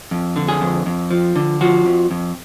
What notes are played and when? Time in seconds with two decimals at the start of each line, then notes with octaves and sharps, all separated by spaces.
0.11 F2
0.36 D3
0.48 G#4
0.61 F2
0.86 F2
1.11 F3
1.36 D3
1.61 F3 F#4
1.86 F2
2.11 F2